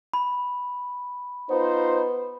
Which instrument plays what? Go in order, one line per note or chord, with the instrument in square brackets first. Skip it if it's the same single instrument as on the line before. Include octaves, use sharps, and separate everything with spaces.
[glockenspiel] B5
[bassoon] B3 [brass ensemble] D#4 F4 C5